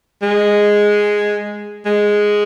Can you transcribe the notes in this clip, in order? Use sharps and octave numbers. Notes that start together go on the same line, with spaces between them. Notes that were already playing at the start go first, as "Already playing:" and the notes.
G#3
G#3